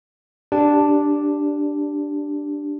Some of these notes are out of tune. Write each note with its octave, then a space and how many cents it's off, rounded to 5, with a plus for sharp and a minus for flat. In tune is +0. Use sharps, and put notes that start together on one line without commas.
D4 +0 G4 +0